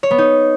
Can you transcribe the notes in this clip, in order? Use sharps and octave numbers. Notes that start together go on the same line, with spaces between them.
C#5
B3
D#4